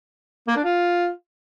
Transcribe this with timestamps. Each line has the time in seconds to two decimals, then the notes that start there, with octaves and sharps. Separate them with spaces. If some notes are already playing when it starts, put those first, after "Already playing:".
0.48 A#3
0.56 D4
0.64 F4